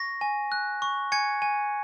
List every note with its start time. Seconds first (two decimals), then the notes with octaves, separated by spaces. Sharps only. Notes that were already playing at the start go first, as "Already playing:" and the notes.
Already playing: C#6 A#6
0.21 G#5
0.52 F#6
0.82 C#6
1.12 G#5 G#6 C#7
1.42 G#5